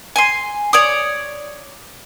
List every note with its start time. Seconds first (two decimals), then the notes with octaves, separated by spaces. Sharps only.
0.16 G#5 C6
0.73 C#5 D5 D#6